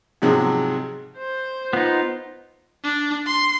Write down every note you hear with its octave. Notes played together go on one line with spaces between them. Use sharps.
G#2 C3 F3 F#3 G#3
C5
B3 D#4 F4
D4
C6